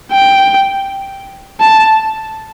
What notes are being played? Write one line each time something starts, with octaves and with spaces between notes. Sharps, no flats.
G5
A5